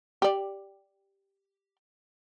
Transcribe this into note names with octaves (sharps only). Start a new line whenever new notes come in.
G4 D5